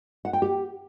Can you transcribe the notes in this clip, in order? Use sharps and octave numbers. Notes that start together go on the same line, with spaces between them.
F#5
G5
G4